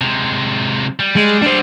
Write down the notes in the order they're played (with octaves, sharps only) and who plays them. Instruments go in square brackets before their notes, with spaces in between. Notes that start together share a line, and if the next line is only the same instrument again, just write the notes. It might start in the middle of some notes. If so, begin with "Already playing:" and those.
[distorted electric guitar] C3 G#3
G3
[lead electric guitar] G#3
D4 C5